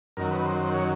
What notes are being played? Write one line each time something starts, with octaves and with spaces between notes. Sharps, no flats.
F#2 D#3 F#3 A#4
B4
C5
C5
C#5